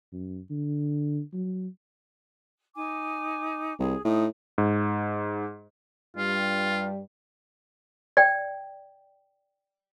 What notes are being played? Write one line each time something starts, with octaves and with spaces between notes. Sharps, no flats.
F#2
D3
F#3
D#4 G#5 D6
C2 G#4
A2 D#4 D#6
G#2
G2 G3 F4
D5 G5